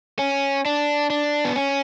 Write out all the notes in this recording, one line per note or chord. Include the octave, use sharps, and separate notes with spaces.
C#4
D4
D4
B3
C#4